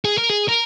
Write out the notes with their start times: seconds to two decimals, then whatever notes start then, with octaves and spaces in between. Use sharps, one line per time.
0.05 G#4
0.18 A#4
0.29 G#4
0.48 A#4